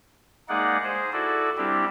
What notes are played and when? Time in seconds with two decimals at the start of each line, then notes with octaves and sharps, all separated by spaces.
0.49 G#3 A#3 D#4 G#4 D5 F#5
0.83 G#4 C5
1.13 E4 F#4 A4 D5
1.57 G3 C4 D4 E4 G4